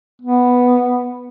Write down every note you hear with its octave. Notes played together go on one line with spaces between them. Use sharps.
B3